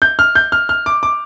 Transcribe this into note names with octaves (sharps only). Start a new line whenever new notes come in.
G6
F6
G6
F6
F6
D6
D6